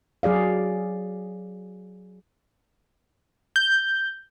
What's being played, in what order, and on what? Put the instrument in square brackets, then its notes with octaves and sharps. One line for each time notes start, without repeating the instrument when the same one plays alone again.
[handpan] F#3 G#4 D5 F5
[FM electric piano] G6